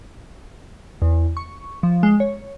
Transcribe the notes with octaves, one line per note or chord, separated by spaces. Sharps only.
E2
C#6
F3
G#3
C#5